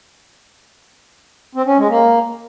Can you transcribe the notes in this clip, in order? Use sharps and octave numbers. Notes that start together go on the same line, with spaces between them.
C4
C#4
G#3
A#3